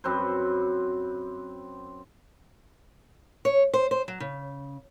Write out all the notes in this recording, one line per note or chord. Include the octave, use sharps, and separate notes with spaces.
F#2 C4 B4 C5
C#5
C5
C5
F#3
C#3